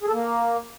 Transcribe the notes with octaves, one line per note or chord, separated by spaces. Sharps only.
G#4
A4
A#3